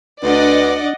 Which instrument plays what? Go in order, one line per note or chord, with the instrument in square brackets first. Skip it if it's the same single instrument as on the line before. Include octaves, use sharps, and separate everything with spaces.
[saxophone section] D2 [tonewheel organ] D4 [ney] B4 [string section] D5 D#5 F#5